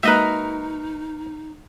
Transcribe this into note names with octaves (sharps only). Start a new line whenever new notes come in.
G#3 A#3 D#4 F#4 A#4 B4 D#5 E5